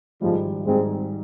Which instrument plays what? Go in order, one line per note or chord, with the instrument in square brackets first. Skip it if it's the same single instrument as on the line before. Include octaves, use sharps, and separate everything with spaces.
[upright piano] G#1 G#2 G3 [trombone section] F3 G#3
[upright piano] G#1 G#2 G3 [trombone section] G#3 C4